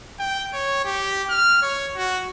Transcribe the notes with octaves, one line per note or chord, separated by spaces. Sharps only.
G5
C#5
G4
F6
C#5
F#4